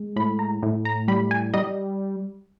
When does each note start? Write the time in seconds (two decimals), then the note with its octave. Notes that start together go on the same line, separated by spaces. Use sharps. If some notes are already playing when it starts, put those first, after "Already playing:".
Already playing: G#3
0.16 A2 B5
0.39 A#5
0.63 A2
0.85 A#5
1.08 G3 B5
1.31 G#5
1.54 G3 D#5